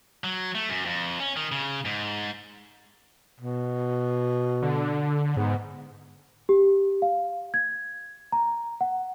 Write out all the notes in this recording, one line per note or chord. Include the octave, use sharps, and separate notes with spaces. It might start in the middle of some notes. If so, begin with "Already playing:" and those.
F#3
A3
F#2
F2
C#4
D#3
C#3
G#2
B2
D3
G#2 B3
G4
F5
G#6
A#5
F#5